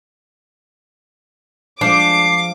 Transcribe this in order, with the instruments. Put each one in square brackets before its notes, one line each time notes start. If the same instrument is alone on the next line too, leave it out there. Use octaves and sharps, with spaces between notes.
[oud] F3 G#3 [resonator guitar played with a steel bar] D4 [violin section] D6 [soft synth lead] C7